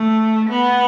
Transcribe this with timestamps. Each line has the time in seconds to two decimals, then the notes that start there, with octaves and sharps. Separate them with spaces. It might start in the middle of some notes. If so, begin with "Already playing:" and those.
Already playing: A3
0.49 B3